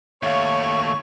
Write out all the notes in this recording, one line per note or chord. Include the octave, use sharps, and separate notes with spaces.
D#2 A3 C#5 E5 F5 C#6